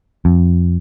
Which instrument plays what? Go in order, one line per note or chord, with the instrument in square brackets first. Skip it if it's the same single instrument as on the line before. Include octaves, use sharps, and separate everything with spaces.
[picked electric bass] F2